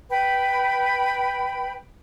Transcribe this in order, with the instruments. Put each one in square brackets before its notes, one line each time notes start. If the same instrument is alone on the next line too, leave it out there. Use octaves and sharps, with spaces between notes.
[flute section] B4 G5 B5